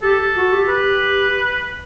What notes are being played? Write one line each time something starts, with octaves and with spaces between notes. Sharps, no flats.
G4 A4
F#4
G4
B4